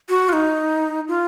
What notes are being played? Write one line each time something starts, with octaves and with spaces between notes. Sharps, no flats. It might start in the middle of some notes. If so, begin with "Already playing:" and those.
F#4
F4
D#4
F4